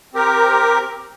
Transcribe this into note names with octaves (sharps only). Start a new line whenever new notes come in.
C4 G4 A#4